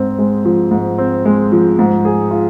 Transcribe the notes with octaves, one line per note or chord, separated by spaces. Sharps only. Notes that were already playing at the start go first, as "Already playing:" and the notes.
Already playing: G#2 C4
G#3
F3
G#2
C4
G#3
F3
G#2
G#4
F4